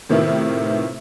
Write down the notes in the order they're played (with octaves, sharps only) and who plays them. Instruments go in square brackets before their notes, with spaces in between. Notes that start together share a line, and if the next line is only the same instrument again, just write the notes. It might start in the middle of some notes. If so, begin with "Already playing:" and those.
[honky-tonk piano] A2 C3 D#3 B3 E4 F4